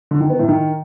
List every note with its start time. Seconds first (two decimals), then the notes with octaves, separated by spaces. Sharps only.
0.11 D3
0.20 D#3
0.30 B3
0.39 A2
0.48 D#3